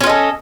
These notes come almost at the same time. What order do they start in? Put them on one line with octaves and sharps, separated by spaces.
C#4 F4 D#5 A4